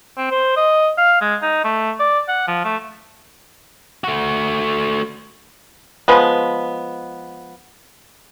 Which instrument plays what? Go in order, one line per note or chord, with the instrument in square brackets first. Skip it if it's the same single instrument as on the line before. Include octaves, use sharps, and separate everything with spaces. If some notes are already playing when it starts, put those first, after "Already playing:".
[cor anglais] C4
C5
D#5
F5
G#3
D#4
A3
D5
F#5
F3
A3
[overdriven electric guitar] A3 F#4
[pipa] F3 G#3 B3